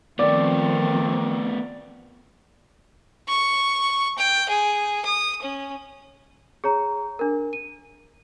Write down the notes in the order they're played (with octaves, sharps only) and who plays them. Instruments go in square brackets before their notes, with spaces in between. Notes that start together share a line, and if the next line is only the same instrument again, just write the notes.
[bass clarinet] D#3 [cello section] F3 C4 [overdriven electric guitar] A3 B3 [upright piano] D5
[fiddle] C#6
G5
G#4
D#6
C#4
[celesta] G#4 C#5 A#5
D4 A#4
D#7